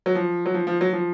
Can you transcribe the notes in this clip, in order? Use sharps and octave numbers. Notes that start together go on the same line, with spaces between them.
F#3
F3
F#3
F3
F3
F#3
F3